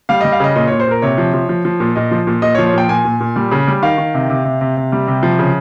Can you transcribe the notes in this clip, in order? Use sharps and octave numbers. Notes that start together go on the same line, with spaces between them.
G3 F5
G3 D#5
F5
C#3 D#5
A#2 D#5
A#2 C#5
C5
A#2 A#4
C3 C#5
F3
F3
F3
F3
A#2
A#2 D#5
F3
A#2
A#2 D#5
C#5
F3
C#5
A#2 G5
A#2 G#5
A#2
A#2
G3
C#3
G3
D#3 F5
D#3
C3
C3
C3
C3
C3
G3
C3
F3
C#3